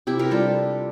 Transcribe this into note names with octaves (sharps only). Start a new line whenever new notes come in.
C3 E4 G4
G4 A#4
G3 D4 F4 A4